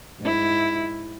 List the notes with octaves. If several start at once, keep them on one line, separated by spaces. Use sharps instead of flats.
G#2 E4